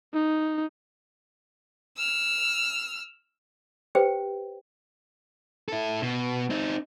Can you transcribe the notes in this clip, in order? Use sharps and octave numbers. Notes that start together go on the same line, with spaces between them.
D#4
E6 F6
G4 B4 C5 G5
E4 A4
B2
C4 D#4